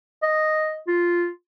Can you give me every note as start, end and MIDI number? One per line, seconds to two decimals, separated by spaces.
0.22 0.76 75
0.87 1.28 65